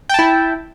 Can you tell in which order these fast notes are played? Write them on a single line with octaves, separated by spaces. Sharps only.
G5 A5 E4